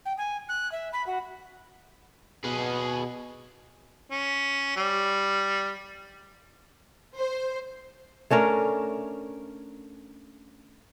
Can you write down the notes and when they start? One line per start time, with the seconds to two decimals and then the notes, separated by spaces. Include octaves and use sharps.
0.06 G5
0.18 G#5
0.49 F#6
0.72 E5
0.93 B5
1.07 F#4
2.44 B2 G#4 B4
4.11 C#4
4.77 G3
7.16 C5
8.30 A3 C#4 D4 A#4